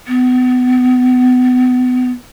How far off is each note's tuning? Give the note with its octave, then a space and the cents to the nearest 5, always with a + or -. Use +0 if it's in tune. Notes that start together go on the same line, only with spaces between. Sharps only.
B3 +30